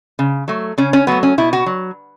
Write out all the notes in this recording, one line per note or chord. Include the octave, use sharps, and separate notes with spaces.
C#3
F#3 A3
C#3 C#4
C#4
F#3 A3 B3
C#4
B2 E4
F#4
F#3